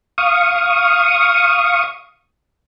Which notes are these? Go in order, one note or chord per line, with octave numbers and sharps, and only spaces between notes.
F5 C#6 D#6